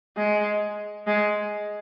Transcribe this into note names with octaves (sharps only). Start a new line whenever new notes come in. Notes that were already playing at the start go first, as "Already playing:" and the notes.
G#3
G#3